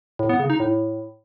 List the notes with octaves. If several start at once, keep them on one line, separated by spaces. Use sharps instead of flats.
A2
B3
C#3
D#4
A2